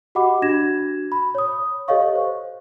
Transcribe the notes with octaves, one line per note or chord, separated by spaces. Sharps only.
F#4 G4 D#5 F#5 B5 D6
D4 F#4 G#6 A#6 E7
B5
C#5 D#6
G4 A4 C#5 D#5 F5 C#6
C5